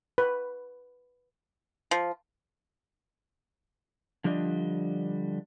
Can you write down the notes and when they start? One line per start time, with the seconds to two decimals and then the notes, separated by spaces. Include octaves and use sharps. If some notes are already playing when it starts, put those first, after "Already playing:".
0.18 B4
1.91 F3
4.24 D3 F3 G3 D4 D#5